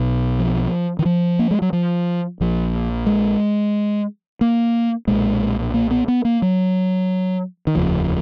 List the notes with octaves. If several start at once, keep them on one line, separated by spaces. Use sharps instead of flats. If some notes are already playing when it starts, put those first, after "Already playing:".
Already playing: B1 B2
F3
D#3
F3
A#3
G#3
F#3
F3
A#1 A#2 F3
G#3
A#3
B1 A#2 G#3
A#3
B3
B3
A#3
F#3
D#3
F1 D#2 C#3 F3